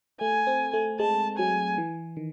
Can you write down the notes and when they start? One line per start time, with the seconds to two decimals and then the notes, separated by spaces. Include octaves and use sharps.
0.20 A3 G#5
0.47 C4
0.73 A3
0.99 G#3 A5
1.38 F#3 G#5
1.78 E3
2.17 D#3